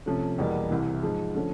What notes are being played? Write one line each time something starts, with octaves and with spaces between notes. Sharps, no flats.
C3 F3 A3 C#4
E2 B2 G3 A#3
C2 C3 E3
G#2 F3 G#3
D3 F3 A3 C#4